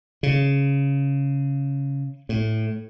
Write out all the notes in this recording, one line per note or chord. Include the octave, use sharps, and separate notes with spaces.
C#3
A2